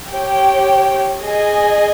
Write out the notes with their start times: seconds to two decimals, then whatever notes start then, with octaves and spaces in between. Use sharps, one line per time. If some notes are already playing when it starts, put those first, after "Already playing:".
0.12 G4 C#5 G5
1.20 G#4 D#5 G#5